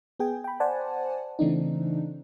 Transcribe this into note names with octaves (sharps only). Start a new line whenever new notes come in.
B3 G#4 G5 G#5
G5 B5
C5 D5 F#5 G#5 A5
C#3 E3 A3 C4 D4 D#4